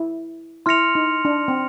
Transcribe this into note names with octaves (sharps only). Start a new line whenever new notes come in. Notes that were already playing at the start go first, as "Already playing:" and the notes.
Already playing: E4
E4 C6 F6 A#6 C#7 F7
D#4
D4
C4